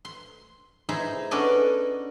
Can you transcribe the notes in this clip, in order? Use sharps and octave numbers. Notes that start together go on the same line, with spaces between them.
C6
D#4 E4 G#4 C5
B3 C#4 D4 A4 D5 D#5